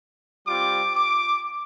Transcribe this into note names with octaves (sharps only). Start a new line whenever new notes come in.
G3 C4 F4 D6
D6